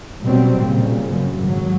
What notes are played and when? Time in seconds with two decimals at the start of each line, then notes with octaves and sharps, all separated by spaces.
0.24 B2 F#3 G3 C4
0.60 A#2 C#3
1.12 F#2 C#3
1.45 G#1 F#3